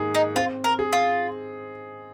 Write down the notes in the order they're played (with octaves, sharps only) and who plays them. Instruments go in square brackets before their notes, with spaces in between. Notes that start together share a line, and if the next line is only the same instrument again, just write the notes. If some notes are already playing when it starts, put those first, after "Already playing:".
Already playing: [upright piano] G#2 D#3 A#3 G#4
[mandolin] D#4
[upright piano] C4 [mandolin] F4
[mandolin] A#4
[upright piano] G#4
[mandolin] F4